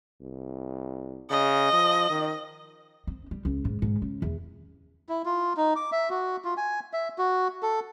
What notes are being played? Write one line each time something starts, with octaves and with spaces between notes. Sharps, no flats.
C2
C#3 D#5
F3
D#3
C4
G3
C#2
G#2
G#2
C#3
E2
E4
F4
D#4
D6
E5
F#4
F4
G#5
E5
F#4
A4